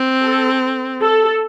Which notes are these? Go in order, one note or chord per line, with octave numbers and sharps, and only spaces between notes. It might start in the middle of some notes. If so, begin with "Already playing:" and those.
Already playing: C4
A4
A4